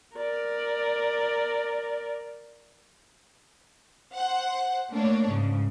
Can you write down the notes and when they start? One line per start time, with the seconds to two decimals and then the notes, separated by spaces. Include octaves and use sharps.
0.16 A#4 D5
4.14 C5 F#5
4.91 A3 A#3 D4 C#5
5.28 G#2 C#3